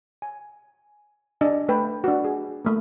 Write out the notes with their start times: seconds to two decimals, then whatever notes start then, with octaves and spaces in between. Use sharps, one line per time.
0.22 G#5
1.41 D4 D#5 G#5
1.69 A3 B4 G5
2.04 D4 F#4
2.24 G#4
2.65 A3 A#3